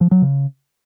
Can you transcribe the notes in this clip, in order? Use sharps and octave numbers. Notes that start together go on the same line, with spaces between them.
F3
F#3
C#3